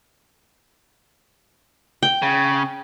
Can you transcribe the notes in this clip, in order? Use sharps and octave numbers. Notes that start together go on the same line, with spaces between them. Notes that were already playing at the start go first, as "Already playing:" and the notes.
G5
C#3